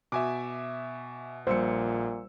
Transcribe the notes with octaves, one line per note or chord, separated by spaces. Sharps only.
B2 E5 G#5 D6
A#1 A#2 G3 C5 E6 C#7